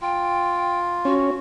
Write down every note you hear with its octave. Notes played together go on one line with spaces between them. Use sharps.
F4 G5
C#4 F#4